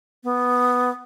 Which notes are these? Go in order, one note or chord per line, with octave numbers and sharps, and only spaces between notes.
B3